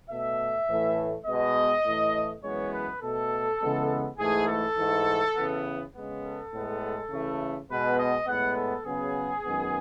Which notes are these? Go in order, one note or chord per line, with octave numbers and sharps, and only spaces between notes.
B2 A3 E5
A2 E3 A3
B2 G#3 B3 D#5
A2 E3 A3
F#2 E3 G#3 B3 C#5
B4
B2 A3 A4
C#3 E3 G#3 B3
G#2 E3 A3 G#4
A4
G#2 E3 A3
C#3 E3 B3
C#3 G#3 B3
A4
A2 G#3 B3
C#3 E3 A3
B2 G#3 B3 B4
D#5
A2 G#3 B3 F#5
A4
C#3 F#3 B3 G#4
F#2 D#3 G#3 B3